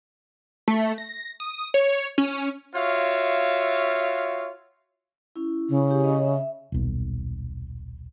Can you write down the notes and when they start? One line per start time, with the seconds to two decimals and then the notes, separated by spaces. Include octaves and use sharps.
0.68 A3
0.98 A#6
1.40 D#6
1.74 C#5
2.18 C#4
2.75 F4 F#4 C#5 E5 F5
5.36 C#4 E4
5.69 C#3
5.88 E4 G4
6.04 C#4 C#5 D#5
6.25 E5
6.72 D#1 B1